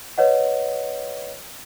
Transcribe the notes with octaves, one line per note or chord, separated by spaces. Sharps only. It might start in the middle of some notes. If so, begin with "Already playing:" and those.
B4 C#5 D#5 F#5